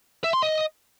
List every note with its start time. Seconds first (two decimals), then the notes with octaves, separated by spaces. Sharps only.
0.24 E5
0.33 C6
0.43 D#5